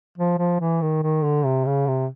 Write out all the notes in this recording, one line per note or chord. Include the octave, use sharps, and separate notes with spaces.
F3
F3
E3
D#3
D#3
D3
C3
C#3
C3